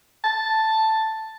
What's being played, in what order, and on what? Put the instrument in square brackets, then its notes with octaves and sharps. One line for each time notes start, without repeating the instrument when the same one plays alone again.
[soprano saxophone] A5